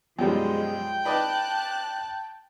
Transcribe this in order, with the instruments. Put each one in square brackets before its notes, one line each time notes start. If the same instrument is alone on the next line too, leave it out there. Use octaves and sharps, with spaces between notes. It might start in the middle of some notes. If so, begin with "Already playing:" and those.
[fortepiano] F#2 B2 G3 [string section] F3 G#3 [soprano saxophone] G5
[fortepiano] B4 D5 D#5 [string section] A5 F#6